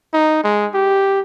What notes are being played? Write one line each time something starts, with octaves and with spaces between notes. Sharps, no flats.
D#4
G#3
G4